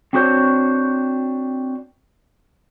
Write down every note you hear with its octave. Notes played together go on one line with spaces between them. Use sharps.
C4 D4 F#4 G4 C5 C#5